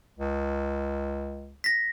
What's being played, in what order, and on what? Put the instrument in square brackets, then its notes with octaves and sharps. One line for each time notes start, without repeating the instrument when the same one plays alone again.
[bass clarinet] C#2
[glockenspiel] A#6 B6